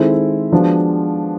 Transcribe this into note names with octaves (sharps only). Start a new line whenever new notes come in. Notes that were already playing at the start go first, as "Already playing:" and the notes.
Already playing: D#3 G#3 C4 E4 A4
F3 G#3 B3 D4 F#4